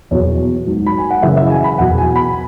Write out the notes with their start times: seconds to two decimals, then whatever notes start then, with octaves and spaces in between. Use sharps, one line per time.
0.11 E2 B2 F#3 C#5
0.66 G#2 F#3
0.86 B5
0.98 G#5
1.10 F#5
1.23 F#2 C#3 E3 E5
1.37 E5
1.50 G#5
1.64 B5
1.78 E2 B2 F#3 F#5
1.98 G#5
2.16 B5